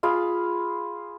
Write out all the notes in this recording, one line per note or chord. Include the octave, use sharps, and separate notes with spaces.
F4 G#4 F5 B5